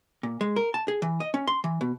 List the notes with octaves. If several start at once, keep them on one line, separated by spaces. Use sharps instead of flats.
A#2
G#3
A#4
A5
G#4
E3
D#5
C#4
C6
E3
B2